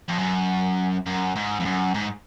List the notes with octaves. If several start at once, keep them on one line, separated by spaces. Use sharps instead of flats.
F2
F#2
F#2
G#2
F2
F#2
G#2